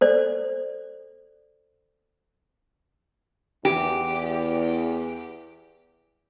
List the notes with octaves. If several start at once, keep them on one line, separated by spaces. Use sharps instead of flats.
A4 C5 D5
E2 G4